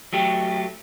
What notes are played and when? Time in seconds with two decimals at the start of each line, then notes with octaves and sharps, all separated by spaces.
0.13 F#3 A3 G4